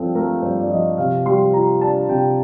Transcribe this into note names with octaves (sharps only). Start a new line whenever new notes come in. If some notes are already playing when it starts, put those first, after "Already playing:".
Already playing: G2 F3 C4 A4
A3 A#4
G2 C5
D5
F3 D#5
C3 F5
G3 C6
F4 A#5
D4 A5
C3 G5